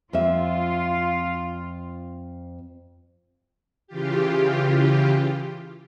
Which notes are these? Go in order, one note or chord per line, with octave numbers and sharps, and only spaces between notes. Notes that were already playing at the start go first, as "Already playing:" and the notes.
F2 F4 E5
C#3 E3 F4 G4